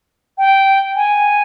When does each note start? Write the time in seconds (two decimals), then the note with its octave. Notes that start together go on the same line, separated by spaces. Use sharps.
0.38 G5
0.96 G#5